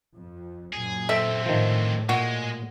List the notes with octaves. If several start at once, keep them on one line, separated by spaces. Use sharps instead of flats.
F2
F#2 A#2 G#4
D3 C4 A4 E5
A2 D#3 F3
A#2 G#3 F#4